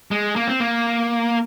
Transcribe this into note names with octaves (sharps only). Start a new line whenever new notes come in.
G#3
A#3
C4
A#3